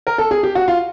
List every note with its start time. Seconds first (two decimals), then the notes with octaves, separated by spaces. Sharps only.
0.07 A#4
0.18 A4
0.31 G#4
0.43 G4
0.55 F#4
0.68 F4